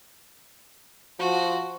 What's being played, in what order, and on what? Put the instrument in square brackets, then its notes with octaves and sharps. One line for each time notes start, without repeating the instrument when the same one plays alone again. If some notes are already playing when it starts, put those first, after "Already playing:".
[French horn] F3 [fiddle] F#4